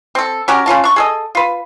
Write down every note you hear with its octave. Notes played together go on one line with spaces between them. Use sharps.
C4 A4
C#4 F#4 G4 A#4
C#3 C#4 F4 A5
D4 C#6
G#4 A4 D#5
F4 B4